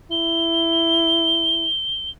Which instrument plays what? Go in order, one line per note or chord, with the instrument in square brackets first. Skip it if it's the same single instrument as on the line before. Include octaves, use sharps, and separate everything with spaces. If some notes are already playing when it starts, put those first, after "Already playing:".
[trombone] E4 [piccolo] G7